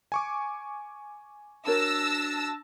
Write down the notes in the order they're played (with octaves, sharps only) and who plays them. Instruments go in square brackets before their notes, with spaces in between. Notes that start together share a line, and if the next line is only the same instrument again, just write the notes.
[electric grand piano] G#5 C#6 D6
[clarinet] D4 [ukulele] F#4 A#4 C#5 [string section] A5 E6 A#6